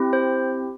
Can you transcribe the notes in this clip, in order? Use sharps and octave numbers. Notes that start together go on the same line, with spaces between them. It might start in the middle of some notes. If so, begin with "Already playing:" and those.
Already playing: C4 E4 G4
C5